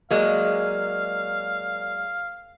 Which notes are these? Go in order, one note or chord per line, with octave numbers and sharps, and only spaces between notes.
F#3 G#3 A#3 A#4 D5 F5